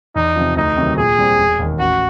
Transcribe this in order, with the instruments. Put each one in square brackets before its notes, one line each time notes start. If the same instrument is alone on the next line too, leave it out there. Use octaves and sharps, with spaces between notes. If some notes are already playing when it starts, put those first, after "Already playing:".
[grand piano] E2 [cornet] D#4
[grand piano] C3 F3
[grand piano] D2 [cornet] D#4
[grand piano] C3 D#3 F#3
[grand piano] A#2 [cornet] G#4
[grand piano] G3 C4
E1
D#2 D#3
[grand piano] A1 [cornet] F#4